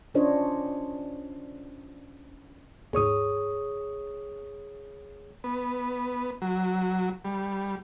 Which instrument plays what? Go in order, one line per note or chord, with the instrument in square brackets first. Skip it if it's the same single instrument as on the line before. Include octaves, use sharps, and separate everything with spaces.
[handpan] C#4 D4 F4 C5 C#5 D#5
[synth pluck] D#2 G#2 [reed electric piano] G#4 C#5 D#6
[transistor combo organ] B3
F#3
G3